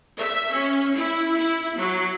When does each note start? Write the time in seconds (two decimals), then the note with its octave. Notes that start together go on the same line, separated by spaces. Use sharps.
0.18 E5
0.53 C#4
0.95 E4
1.36 E4
1.77 F#3